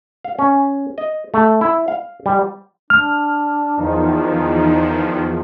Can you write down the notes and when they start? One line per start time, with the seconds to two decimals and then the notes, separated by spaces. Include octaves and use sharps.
0.24 F5
0.39 C#4
0.98 D#5
1.34 A3
1.61 E4
1.88 F5
2.26 G3
2.90 D4 F6
3.77 E2 D#3 F3 D#4